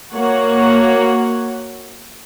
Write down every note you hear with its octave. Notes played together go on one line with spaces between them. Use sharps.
A#3 F#4 C#5 F#5